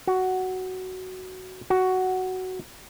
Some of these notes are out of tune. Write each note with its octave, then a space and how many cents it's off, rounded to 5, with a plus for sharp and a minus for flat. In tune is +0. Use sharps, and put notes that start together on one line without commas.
F#4 +10
F#4 +10